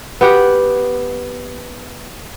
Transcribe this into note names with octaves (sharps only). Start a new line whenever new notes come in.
B3 G4 F#5